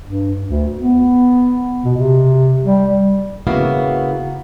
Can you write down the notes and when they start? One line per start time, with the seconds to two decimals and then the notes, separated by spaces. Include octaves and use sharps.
0.05 G2
0.48 D2
0.76 B3
1.84 B2
1.97 C3
2.64 G3
3.47 C#3 A#3 B3 E4 F#4 F5